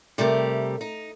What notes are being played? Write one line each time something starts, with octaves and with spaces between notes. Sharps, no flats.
C3 G3 A3 G4 A#4
D#4